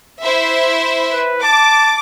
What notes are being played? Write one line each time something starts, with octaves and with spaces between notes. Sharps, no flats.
E4 C5 E5
B4
A5 D6